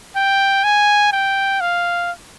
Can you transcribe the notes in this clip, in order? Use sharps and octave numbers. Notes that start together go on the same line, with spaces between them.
G5
G#5
G5
F5